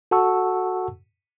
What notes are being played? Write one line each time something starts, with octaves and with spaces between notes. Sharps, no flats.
F#4 A4 F#5 A5 C#6 E6